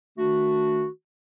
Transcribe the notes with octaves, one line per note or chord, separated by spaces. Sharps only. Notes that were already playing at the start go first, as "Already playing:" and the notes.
D#3 A3 D4 F#4